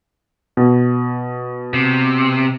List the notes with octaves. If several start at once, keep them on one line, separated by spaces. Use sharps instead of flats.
B2
C3